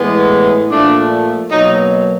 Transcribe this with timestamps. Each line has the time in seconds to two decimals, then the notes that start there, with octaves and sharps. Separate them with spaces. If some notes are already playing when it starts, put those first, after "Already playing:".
Already playing: A2 E3 G#3 B3
0.70 A#2 F3 A3 D4
1.51 B2 F#3 A#3 D#4